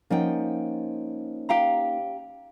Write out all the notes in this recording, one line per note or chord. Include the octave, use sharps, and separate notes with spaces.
F3 A#3 C#4 D#4 F#5 G5
G4 F5 A#5